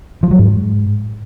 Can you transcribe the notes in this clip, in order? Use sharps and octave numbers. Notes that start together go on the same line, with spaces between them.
F3
F#3
G#2